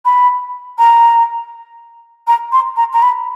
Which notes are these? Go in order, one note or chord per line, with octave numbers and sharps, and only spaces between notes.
B5
A#5
A#5
C6
A#5
A#5
B5